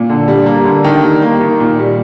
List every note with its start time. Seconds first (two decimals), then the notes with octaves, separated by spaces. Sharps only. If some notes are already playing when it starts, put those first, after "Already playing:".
Already playing: A#2
0.09 D3
0.28 G3
0.46 A#3
0.65 D3
0.84 D#3 G5
1.04 G3
1.22 A#3
1.41 D#3
1.60 A#2
1.79 G3